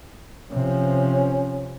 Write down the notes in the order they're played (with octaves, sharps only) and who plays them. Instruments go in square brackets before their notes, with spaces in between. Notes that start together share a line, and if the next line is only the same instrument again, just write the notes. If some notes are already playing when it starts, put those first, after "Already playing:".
[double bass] C3 F3 [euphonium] C#4